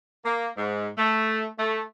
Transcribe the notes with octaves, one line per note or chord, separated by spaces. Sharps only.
A#3
G#2
A3
A3